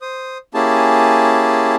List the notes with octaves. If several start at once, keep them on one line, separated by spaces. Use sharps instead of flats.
C5 D#6
A#3 C#4 E4 G4 G#4 A5